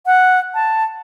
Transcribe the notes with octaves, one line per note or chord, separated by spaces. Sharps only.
F#5
A5